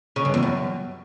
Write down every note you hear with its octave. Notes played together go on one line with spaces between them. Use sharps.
C#3
G2
E2
F#2